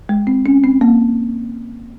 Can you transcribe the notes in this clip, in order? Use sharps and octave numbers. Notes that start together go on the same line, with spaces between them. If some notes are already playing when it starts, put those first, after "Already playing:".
G#3
C4
C#4
C4
A#3